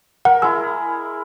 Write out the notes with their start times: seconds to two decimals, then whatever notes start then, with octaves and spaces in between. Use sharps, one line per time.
0.25 A#4 F#5
0.42 G#3 E4 E6